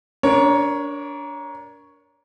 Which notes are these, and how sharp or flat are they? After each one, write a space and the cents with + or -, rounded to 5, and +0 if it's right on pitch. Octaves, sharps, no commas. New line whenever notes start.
D4 -25 A#4 +15 C#5 +0